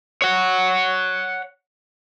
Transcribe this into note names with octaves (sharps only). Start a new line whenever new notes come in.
C#5 F#5